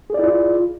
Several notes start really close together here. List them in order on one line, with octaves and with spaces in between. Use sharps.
G#4 D5 E4 F4